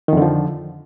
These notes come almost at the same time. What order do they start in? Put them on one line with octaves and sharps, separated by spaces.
D#3 F2 D3 F3